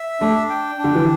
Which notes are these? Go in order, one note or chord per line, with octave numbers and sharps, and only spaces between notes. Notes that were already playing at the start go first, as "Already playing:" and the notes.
Already playing: E5
A3 D4
G5
D4
D3
E3